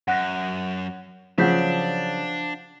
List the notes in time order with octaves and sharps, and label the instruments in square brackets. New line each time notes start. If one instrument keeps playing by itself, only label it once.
[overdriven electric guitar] F#2 [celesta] F#5 F#6 A#6
[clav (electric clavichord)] C#3 F#3 [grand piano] F3 [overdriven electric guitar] D4 [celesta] F#5 G6 B6